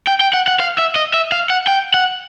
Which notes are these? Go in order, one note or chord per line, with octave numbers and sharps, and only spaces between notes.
G5
G5
F#5
F#5
F5
E5
D#5
E5
F5
F#5
G5
F#5